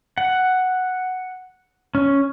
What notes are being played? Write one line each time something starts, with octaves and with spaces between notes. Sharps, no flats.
F#5
C#4